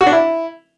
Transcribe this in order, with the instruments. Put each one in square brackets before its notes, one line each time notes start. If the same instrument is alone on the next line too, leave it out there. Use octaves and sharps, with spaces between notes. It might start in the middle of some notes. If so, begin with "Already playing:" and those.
[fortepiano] F#4
D4
E4